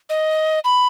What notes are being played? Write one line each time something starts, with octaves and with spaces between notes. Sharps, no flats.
D#5
B5